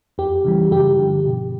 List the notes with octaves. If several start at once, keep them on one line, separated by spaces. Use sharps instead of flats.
F2 G4
C#3 E3 G3
G2 G4
D3 F3
B2